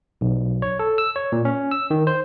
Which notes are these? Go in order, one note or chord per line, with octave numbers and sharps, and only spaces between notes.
B1
C#5
A4
E6
C#5
A#2
C#4
E6
D#3
C5